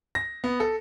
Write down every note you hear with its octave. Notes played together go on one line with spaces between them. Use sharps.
A#6
B3
A4